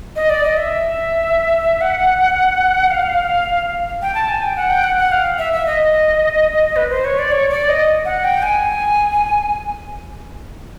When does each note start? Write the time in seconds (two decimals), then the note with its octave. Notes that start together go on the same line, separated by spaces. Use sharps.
0.16 D#5
0.30 D5
0.44 D#5
0.57 E5
1.81 F#5
2.91 F5
4.02 G5
4.15 A5
4.29 G#5
4.43 G5
4.56 F#5
4.70 G5
4.83 F#5
4.98 F#5
5.12 F5
5.38 E5
5.53 E5
5.66 D#5
6.76 B4
6.90 C5
7.05 C#5
7.19 D5
7.32 C#5
7.50 D5
7.69 D#5
8.05 F#5
8.24 G5
8.42 G#5